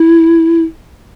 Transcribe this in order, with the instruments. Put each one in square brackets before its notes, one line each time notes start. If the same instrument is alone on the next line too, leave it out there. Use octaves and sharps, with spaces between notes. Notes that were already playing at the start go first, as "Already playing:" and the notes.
Already playing: [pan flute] E4